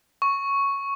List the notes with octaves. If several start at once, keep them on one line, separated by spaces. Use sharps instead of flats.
C#6